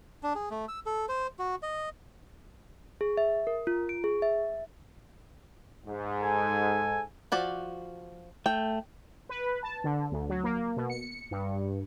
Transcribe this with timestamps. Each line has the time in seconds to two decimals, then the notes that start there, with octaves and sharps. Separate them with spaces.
0.23 D4
0.35 G#4
0.51 A3
0.68 E6
0.86 A4
1.09 C5
1.39 F#4
1.63 D#5
3.01 G#4
3.17 E5
3.47 A#4
3.67 F4
3.89 D7
4.04 G#4
4.22 E5
5.87 G#2
6.23 A4 G#5
7.32 F3 F#4 D5
8.46 A3 G5
9.29 B4
9.63 A5
9.84 D3
10.12 D2
10.29 F#3
10.44 A#3
10.77 B2
10.90 C#7
11.31 G2